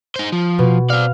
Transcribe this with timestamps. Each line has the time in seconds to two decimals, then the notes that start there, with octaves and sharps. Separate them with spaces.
0.16 D#4 C5
0.32 F3
0.59 B2
0.90 C4 D5 F5